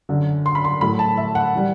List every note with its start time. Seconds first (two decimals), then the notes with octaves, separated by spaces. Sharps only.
0.09 F#2 D3 F#3
0.46 C6
0.55 B5
0.64 C6
0.81 A2 F#3 A3 B5
0.99 A5
1.17 E5
1.35 F#5
1.55 E3 G3